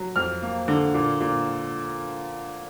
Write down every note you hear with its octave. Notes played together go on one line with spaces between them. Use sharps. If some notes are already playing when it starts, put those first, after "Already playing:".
Already playing: F#3
F2 F6
A#3
D3
A#2
A#2